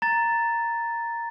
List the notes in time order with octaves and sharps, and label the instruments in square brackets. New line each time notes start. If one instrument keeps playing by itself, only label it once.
[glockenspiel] A#5 A6